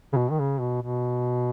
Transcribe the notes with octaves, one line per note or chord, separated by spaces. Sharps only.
C#3
B2
D#3
C#3
B2
B2